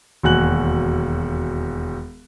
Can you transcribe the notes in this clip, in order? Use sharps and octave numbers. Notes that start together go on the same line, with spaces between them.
E1 D#2 F#4 G#5 F#6 F#7